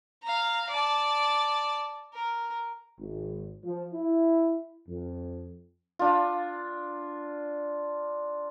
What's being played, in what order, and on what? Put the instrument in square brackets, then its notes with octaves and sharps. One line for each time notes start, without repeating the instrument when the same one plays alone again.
[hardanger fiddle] F5 A#5
D5 A5
A#4
[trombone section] G#1
F3
E4
F2
[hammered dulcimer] D4 F4